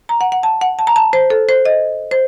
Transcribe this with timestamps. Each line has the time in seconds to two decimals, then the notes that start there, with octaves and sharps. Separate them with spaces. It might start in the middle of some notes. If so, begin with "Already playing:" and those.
0.09 A#5
0.21 F#5
0.32 F#5
0.43 A5
0.61 F#5
0.79 A5
0.87 A#5
0.96 A5
1.13 C5
1.30 A4
1.49 C5
1.65 D#5
2.11 C5